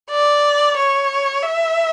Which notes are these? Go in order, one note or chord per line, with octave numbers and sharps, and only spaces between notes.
D5
C#5
E5